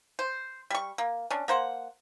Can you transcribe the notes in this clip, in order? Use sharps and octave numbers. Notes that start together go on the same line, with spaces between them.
C5
G3 C#6
A#3
C#4 D4
A#3 C5 F#5